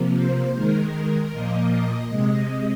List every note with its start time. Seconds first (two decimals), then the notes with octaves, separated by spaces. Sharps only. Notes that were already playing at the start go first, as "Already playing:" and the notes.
Already playing: C3 F3 A#3
0.17 C5
0.55 D#3 G#3 A#4
1.32 A#2 F3 A#3 D#5
1.71 D#5
2.09 C3 G#3